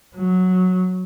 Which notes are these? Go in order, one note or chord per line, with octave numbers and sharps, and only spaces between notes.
F#3